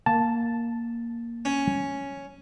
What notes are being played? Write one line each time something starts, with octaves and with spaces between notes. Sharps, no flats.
A#3 A5
C#4